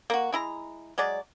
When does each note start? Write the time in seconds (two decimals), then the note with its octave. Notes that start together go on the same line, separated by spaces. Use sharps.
0.10 A#3 F#4
0.32 G#3 E4 A#5
0.98 F#3 G#3 D5